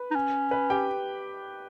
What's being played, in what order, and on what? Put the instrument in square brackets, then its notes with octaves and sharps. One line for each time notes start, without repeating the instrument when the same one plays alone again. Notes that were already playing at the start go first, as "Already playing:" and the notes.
Already playing: [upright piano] B4
[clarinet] D#4
C#4
[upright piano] B4
G4 G5